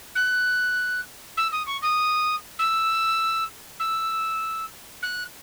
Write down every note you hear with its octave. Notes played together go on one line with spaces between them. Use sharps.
F#6
E6
D#6
C#6
D#6
E6
E6
F#6